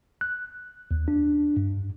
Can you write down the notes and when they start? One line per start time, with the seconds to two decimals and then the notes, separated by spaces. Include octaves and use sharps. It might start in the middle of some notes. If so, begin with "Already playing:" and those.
0.21 F#6
0.91 D#2
1.08 D4
1.57 G2